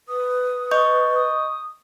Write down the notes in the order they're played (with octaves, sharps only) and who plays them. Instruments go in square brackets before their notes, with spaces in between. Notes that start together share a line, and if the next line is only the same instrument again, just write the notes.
[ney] B4 [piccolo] D#6
[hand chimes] D#5 C#6 G6
[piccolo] D#6